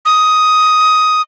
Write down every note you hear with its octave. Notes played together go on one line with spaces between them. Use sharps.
D#6